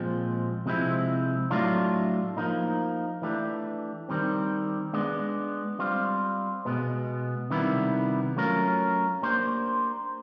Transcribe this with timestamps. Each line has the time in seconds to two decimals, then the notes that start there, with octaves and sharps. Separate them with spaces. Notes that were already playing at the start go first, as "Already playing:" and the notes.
Already playing: A#2 F3 G#3 C4
0.66 C3 F3 G#3 C4 E4
1.50 A2 F#3 A3 D4 F4
2.37 F3 A#3 D#4
3.22 E3 A3 D4 G4
4.09 D#3 G3 C4
4.93 G#3 B3 D4
5.79 G3 C4 F4
6.65 B2 G#3 B3
7.50 C3 D#3 G3 B3 E4
8.36 F#3 A3 C#4 F4 A#4
9.22 A#3 D4 G4 C5